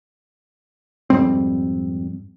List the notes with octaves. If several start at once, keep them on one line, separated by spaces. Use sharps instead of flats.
F2 G#2 G3 C4